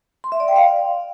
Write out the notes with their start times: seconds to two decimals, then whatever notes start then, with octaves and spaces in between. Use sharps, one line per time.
0.24 C6
0.32 E5
0.40 D5
0.48 G5
0.56 F5